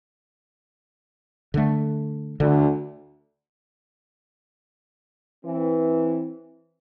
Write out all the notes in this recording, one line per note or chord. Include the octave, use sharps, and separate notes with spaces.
D3 A3
D2 D3
E3 C4